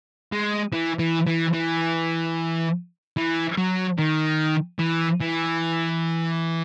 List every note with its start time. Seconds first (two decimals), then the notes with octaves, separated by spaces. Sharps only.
0.32 G#3
0.72 E3
0.99 E3
1.27 E3
1.54 E3
3.17 E3
3.57 F#3
3.98 D#3
4.79 E3
5.20 E3